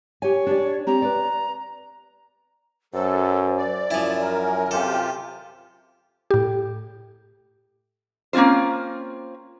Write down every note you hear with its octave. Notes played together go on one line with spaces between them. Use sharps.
G4 C#5 G#5
D4 G4 D5
C4 G4 A#5
B4 D5
F#2 F#3 A4 C5
D5
F#2 F3 E4 G#5
A#4
C3 F4 G4 A4
A2 G4
A#3 C4 C#4 F4 C5